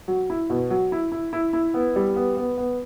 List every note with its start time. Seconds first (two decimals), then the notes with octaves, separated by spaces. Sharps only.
0.08 F#3
0.30 E4
0.50 B2
0.70 F#3
0.92 E4
1.12 E4
1.33 E4
1.53 E4
1.74 B3
1.96 G3
2.16 B3
2.37 B3
2.57 B3